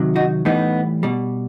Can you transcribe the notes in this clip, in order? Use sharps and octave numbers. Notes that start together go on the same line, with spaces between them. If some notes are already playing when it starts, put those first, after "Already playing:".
Already playing: C3 D#3 F#3
D#4 F#4
A2 E3 G3 B3 D#4
B2 G3